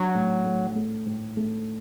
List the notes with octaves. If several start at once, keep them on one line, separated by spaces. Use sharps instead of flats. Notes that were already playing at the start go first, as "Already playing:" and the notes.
Already playing: F#3 D4
A2
A3
A3
A2
A3